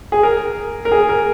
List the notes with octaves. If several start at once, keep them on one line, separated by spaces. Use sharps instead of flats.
G#4
A#4
A#4
G#4
A#4